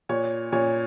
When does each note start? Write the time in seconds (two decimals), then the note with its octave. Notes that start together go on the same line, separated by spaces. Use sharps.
0.09 A#2 C#5
0.52 A#2 C#5